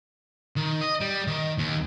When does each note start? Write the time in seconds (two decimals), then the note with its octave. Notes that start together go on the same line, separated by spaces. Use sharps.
0.57 D#3
0.82 D#5
1.01 G3
1.27 D#3
1.58 D#2